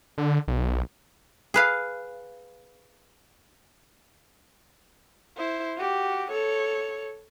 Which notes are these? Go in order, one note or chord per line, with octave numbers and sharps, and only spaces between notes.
D3
B1
G#4 B4 F5
E4 C5
F#4 G4
A4 C#5